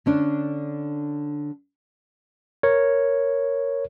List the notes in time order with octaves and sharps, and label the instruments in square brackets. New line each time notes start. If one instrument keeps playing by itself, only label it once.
[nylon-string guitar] D3 C#4 D4
[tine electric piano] A#4 C#5